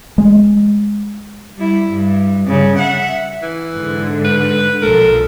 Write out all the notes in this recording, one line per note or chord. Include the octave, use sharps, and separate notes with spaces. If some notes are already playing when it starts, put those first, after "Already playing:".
G#3
G3 E4
G2
G2 C#3
E5 F#5
E3
G#2 D3
B4
B1 A#2 F3 A4 A#4